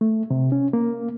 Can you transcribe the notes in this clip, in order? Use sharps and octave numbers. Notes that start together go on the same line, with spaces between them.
A3
C3
C#4
A#3